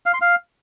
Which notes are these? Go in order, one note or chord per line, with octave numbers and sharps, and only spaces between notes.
F5
C6
F5